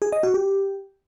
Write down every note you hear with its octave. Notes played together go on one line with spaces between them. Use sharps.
G#4
D#5
F#4
G4